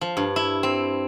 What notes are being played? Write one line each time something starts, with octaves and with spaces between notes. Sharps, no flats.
F3
G2
E4
C4